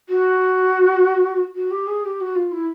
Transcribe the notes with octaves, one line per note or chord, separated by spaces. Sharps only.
F#4
F#4
G4
G#4
G4
F#4
F4
E4